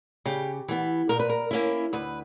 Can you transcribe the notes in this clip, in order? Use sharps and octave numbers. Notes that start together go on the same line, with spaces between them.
C#3 G4
E3 B3
A#2 A#4
B4
A#4
A#3 C#4 E4
D2 B4